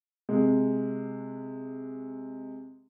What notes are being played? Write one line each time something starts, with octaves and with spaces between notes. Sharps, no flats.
C3 G#3